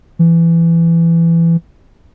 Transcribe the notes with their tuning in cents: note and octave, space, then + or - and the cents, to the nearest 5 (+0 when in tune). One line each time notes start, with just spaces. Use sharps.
E3 +20